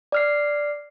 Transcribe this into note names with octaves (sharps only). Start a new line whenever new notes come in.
D5 F6 C7